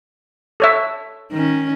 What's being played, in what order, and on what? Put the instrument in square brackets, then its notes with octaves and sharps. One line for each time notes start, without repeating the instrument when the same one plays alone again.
[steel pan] A4 C#5 E5
[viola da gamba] D#3 C#4